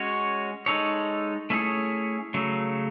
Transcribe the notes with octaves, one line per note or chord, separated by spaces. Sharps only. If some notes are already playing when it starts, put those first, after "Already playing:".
Already playing: G#3 C#4 F#4 C#5
G#3 D#4 A4 C#5
A3 C#4 E4 G#4 C#5
C#3 F#3 A3